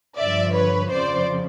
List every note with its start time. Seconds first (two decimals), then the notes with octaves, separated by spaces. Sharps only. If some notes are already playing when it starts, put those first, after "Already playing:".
0.17 G2 D3 F3 D5 E5
0.54 B4 C#5
0.90 F2 C#3 F3 C5 D5